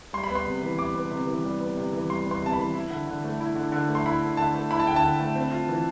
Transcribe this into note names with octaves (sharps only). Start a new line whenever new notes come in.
G3 C6
B5
B3
C6
C3
E3
G3 D6
B3
C3
E3
G3
B3
C3
E3
G3 C6
B3
C6
C3 A5
E3 B5
E4
D3
D3
A3
E4
D3
D3
A3
C6
E4 B5
D3
D3 A5
A3
E4 B5
A5
D3 G5
A5
D3
A3
C4
F4
E3